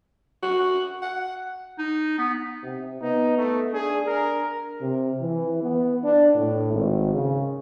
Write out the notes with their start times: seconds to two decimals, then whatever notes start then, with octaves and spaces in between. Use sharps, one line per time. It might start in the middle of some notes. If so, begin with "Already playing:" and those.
0.43 F#4
1.02 F#5
1.79 D#4
2.18 B3
2.63 C3
3.02 B3 D#4
3.37 A3
3.73 D4 G#4
4.07 A#4
4.81 C3
5.22 E3
5.63 B3
6.04 D4
6.35 A2
6.72 G#1
7.14 C#3